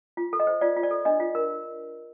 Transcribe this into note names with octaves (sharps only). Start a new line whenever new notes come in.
F4
A4
D#5
C5
F4 D5
F4
D5
A4
D4 D#5
F4
A#4